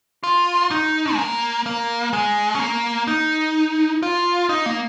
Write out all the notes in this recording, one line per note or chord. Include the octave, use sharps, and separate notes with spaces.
F4
D#4
G#3
A#3
A#3
G#3
C#4
A#3
D#4
F4
D#4
A#3